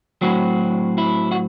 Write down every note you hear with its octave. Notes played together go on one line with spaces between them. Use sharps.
A2 F#3 C4 F#4
E4
F#4